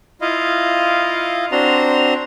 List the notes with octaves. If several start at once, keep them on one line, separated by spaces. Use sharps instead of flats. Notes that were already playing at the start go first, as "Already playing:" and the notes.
E4 F4 D#5 F5
C4 D4 F#4 A#5 C6